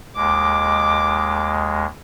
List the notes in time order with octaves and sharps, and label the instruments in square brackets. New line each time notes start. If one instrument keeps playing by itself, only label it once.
[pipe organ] D#2 G#3 [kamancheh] D6